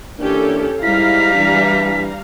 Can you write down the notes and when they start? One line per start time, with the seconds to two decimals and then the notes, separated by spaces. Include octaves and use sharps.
0.20 E3 A#3 C#4 D4 G4 A4
0.83 G#2 G3 E4 F5 A#5 B6
1.35 E3 D4